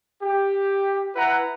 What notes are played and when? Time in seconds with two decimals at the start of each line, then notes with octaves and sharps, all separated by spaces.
0.23 G4
1.16 E4 B4 F#5 A#5